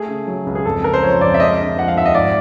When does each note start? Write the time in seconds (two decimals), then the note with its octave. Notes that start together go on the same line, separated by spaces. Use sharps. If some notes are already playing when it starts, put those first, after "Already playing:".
Already playing: A3 G#4
0.08 C#3
0.27 F#3
0.46 C#2
0.55 G#4
0.65 F2 A4
0.84 C#3 A#4
0.94 C5
1.02 F3 C#5
1.21 F2 D5
1.34 E5
1.40 G#3 D#5
1.58 D3
1.77 F3 F#5
1.88 F5
1.96 D#2 E5
2.05 D#5
2.14 G#2 D5